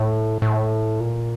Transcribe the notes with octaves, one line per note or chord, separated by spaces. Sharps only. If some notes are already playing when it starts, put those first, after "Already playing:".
Already playing: A2
A2
A#2